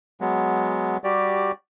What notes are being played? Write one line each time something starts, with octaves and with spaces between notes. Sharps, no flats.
F#3 G#3 B3
G3 F#4 G4 D5